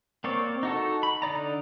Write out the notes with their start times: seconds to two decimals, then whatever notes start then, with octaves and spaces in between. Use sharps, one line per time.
0.24 A#3 C4 C#5 D5
0.63 D#4 F#4 A4
1.03 B5
1.22 D3 D#4 D5 A#5